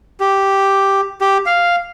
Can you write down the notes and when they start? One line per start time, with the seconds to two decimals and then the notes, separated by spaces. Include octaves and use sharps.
0.20 G4
1.21 G4
1.46 F5